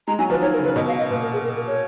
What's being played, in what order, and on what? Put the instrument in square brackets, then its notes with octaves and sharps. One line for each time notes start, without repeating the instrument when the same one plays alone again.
[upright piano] G#3 [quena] A#5
[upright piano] F#3 [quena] G#5
[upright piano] F3 [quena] B4
[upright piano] D#3 [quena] C#5
[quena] A#4
[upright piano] C#3
[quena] B4
[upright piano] B2 [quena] D#5
[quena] F5
D#5
[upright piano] A#2 [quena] B4
[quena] A#4
G#4
A#4
A#4
C#5